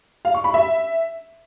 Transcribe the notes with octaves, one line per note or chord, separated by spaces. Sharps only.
F5
C#6
B5
E5